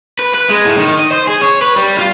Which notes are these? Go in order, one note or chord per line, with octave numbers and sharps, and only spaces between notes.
B4
B4
G#3
A2
D#3
D#5
C5
G#4
C#5
B4
G3
F4